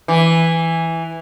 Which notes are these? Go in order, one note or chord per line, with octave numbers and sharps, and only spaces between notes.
E3